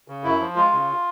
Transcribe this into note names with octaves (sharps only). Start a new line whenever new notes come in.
C#3
F#2 E4
F3
G#3 F4
C#3